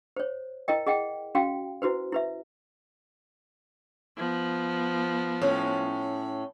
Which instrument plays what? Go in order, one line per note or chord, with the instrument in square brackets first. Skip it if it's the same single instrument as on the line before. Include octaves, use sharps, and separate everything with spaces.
[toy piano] C5 C#5
E4 A#4 D#5 G5
G#4 D#5 F#5 G5
C#4 F#4 F5 G5
E4 F#4 B4 C5
E4 B4 E5
[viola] F3 B3
[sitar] A2 C#4